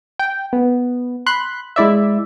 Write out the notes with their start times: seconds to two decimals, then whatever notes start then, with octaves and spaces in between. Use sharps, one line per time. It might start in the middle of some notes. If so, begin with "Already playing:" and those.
0.19 G5
0.53 B3
1.26 B5 C6 F#6
1.76 G#3 E4 D5 E5